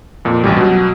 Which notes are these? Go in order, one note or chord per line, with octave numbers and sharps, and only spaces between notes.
F2 A#2
A1 D2 G3
B2 F#3